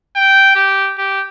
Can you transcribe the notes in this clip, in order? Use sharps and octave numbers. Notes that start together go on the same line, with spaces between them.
G5
G4
G4